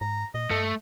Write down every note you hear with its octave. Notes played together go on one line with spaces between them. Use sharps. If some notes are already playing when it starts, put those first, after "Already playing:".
G#2 A#5
A#2 D#5
G2 A3